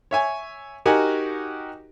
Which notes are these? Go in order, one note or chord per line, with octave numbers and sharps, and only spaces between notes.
C#5 E5 G#5
D#4 F#4 G4 A#4 F#5 G#5